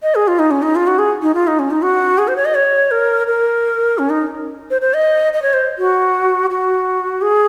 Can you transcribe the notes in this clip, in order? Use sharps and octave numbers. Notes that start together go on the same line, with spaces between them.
D#5
G#4
F4
D#4
C#4
D#4
F4
F#4
G#4
D#4
F4
D#4
C#4
D#4
F#4
G#4
C5
C#5
D#5
C#5
A#4
A#4
C#4
D#4
C5
C5
D#5
D#5
C#5
C5
F#4
F#4
G#4